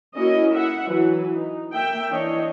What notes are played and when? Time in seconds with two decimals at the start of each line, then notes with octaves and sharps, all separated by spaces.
0.16 A#3 C#4 E4 F#4 D#5
0.53 E4 E5 F#5
0.85 E3 F#3 B4
1.36 D#4
1.73 A#3 E5 G5
2.11 E3 D4 C#5 D#5